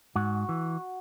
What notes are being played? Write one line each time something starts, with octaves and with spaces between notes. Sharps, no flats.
G#2 F#4
E3